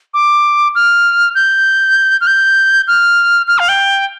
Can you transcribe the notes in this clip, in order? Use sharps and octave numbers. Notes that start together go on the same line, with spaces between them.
D6
F6
G6
F6
G6
F6
F6
F5
G5